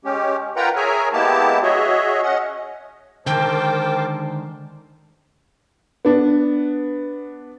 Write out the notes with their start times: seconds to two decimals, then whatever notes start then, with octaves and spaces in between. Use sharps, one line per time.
0.05 G#3 C#4 G4
0.56 F4 A#4 B4 F#5 G5 A#5
0.76 G#4 A#4 C#5 E5 G#5 A#5
1.13 G#3 A#3 B3 E4 G4 A5
1.63 F#4 G#4 C#5 D#5 E5
2.23 C#4 D#5 F#5
3.26 D3 D#3 G#3 A#4 C5 G5 A5 D6
6.05 B3 D4